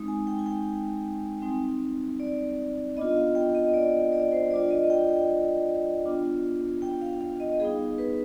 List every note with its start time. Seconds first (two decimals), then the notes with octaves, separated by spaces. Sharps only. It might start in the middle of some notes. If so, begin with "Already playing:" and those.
Already playing: G#3 C4 D#4
0.08 G#5
0.27 G5
0.39 G#5
0.46 G5
1.42 G3 C4 D#4
2.20 D5
2.97 B3 D4 F4 D#5
3.16 F5
3.35 G5
3.55 D#5
3.74 D5
4.13 D5
4.32 C5
4.50 G3 D4 F4 D5
4.71 D#5
4.90 G5
5.09 G5
6.06 B3 D4 F4
6.82 G5
7.01 F5
7.21 F5
7.40 D#5
7.60 G3 B3 D#4 G#4
7.98 B4